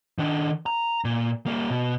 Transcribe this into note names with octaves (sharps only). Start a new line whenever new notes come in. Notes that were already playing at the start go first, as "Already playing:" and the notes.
D#3 D4
A#5
A#2
G3 A#3
B2